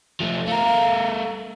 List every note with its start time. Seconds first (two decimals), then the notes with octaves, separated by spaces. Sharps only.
0.20 F3 A3
0.47 A3 A#4 F5